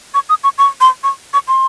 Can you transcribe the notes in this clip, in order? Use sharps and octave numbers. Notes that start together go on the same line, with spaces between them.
C#6
D#6
C#6
C#6
C6
C#6
C#6
C6